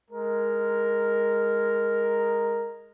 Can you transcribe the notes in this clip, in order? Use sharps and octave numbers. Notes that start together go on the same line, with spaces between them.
G#3 A#4